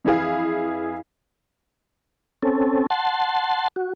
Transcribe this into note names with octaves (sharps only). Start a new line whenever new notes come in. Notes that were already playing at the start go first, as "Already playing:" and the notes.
F2 E3 E4 G#4 F5
C4 C#4 A4
F#5 A5 C6
F#4